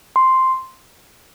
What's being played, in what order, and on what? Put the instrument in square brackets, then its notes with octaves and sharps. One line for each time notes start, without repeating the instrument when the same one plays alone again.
[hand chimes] C6